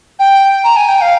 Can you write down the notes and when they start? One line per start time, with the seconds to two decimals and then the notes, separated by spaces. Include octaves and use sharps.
0.19 G5
0.64 A#5
0.76 G#5
0.88 G5
1.01 F5